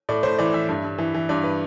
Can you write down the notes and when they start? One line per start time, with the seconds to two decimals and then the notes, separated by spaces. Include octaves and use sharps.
0.09 A2 D5
0.23 A2 C5
0.39 E3 D5
0.54 E3 E5
0.69 G2
0.84 G2
0.98 E3
1.14 E3
1.29 G2 D5
1.44 B4